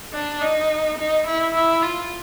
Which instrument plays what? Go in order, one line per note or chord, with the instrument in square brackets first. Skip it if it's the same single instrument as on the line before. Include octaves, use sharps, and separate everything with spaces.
[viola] D4
D#4
D#4
E4
E4
F4